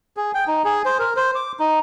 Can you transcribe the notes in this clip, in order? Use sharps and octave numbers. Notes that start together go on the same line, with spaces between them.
G#4
G5
D#4
G#4
C5
A#4
C5
D6
D#4